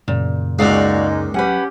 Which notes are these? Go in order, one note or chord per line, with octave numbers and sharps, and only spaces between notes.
F#2 A#2 C#3
C#2 A#2 G#3 D#4 F#4 D5 F5
F#3 C#4 G4 B4 F#5 G#5